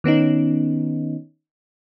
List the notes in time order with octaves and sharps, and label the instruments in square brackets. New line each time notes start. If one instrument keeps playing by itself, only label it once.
[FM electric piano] D#3 B3 C#4 D#4